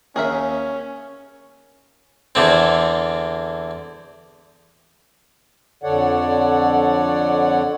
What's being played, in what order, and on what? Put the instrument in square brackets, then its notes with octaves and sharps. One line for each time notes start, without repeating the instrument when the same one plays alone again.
[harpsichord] D#2 D#3 [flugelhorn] C#4 [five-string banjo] G#4 A#4 E5
[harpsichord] E2 D3 C4
[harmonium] F2 D3 A4 C#5 D5 F#5